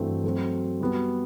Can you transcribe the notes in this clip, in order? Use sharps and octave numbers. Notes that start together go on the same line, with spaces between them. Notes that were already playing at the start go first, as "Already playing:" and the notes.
Already playing: G2 E3 A3 C4 F#4
F#3 A3 C4 F#4
G3 B3 F#4